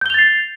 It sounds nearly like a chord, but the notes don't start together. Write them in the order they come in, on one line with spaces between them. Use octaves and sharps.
G6 G7 F7 A6 C7